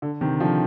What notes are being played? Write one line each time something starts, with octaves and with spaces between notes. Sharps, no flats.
D3
C3 D#3
D3 F3